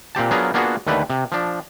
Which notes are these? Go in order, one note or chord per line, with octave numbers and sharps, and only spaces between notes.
A#2 C4 G4 A5
F#3 B3 D4 F4 G#4 A#4
A#3 B3 D4 F4 F#4 G#4
D#2 D3 A3 B4 D5
C3
F3 D4